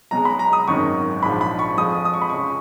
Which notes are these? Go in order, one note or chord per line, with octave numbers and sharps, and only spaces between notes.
B1 B2 G#3 A#5
B5
A#5
D#6
G#1 F#2 D#3 C#6
A#1 G#2 F3 B5
B5
C#6
F2 F3 G#3 D#6
D#6
C#6
B5
C#2 C#3 G#3 C#6